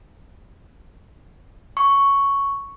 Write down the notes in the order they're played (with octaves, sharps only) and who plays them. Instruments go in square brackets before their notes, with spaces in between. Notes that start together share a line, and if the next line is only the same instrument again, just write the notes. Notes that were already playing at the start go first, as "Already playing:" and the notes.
[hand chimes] C#6